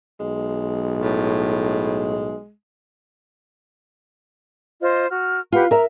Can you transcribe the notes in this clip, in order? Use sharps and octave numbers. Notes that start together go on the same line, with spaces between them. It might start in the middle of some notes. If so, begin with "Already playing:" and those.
B1 G#3
A2
F4 C5 D#5
F#4 F6
F4 G4 B4 F#5
A#4 E5 A#5